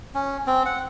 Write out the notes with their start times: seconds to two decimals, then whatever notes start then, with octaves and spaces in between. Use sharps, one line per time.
0.15 C#4
0.47 C4
0.65 F#5